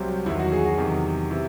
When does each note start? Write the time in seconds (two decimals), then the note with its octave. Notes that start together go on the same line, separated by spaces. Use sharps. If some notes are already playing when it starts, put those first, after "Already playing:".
Already playing: C2 C3 F#3 C5
0.26 E2 D#3 F#3 E4
0.39 F#4
0.52 G#4
0.65 F#4
0.78 E2 C3 D#3 F#3
1.31 C3 E3 E4